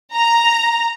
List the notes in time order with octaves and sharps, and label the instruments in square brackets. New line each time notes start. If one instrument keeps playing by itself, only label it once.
[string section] A#5